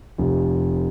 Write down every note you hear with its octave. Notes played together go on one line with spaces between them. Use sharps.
F1